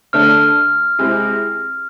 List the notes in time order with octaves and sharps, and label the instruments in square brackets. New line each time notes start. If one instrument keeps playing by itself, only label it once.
[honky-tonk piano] D3 A3 D4 [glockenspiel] F6
[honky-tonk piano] C3 G#3 C4 E4